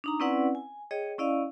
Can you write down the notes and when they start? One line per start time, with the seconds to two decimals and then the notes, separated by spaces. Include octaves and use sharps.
0.04 D4 D#4 A#5
0.20 C4 C#4 E4 B4 D5 F#5
0.55 G#5
0.91 G#4 C#5 D#5 G5
1.18 C#4 E4 D5 D#5 F5 E6